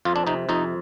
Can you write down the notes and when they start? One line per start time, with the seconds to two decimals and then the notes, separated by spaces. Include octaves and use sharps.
0.05 F2 F4
0.16 D4
0.27 C3 D#4
0.49 F2 D#4